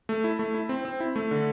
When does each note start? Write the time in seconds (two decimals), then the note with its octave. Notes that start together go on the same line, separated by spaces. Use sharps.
0.09 A3
0.24 E4
0.39 A3
0.54 E4
0.69 C4
0.85 C4
1.00 E4
1.16 A3
1.31 D3